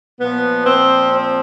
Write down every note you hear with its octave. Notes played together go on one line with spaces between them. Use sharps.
A#2 F3 B3
C4
C4